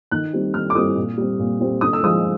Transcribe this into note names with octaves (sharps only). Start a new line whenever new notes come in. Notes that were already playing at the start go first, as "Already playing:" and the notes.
D#3 F#6
G3 C4
D#3 F6
D6
G3 C4 D#6
A#2
G3 C4
A#2
G3 C4
D3 D#6
E6
F3 G#3 D#6